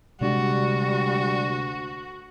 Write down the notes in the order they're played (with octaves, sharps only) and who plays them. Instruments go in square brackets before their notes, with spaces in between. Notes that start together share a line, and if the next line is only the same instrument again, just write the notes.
[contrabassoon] D2 [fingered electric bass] C3 G#3 D4 [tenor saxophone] G3 [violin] F#4